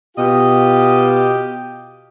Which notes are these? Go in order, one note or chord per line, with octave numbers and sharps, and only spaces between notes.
B2 F4 G4 D#5